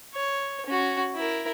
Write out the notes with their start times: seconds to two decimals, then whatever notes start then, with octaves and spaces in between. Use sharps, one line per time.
0.14 C#5
0.66 C#4 F#4
1.15 E4 A#4